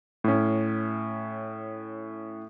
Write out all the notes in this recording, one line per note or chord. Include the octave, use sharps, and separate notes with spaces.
A2 C#4